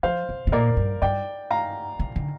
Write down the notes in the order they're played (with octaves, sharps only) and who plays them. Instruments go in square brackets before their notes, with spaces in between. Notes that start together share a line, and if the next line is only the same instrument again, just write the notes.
[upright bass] F3 [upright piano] C5 F5
[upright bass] C3
C3
[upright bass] A#2 [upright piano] A#4 D5
[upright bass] G2
[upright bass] G2 [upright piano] D5 G5
[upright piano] F5 A#5
[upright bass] C3
D3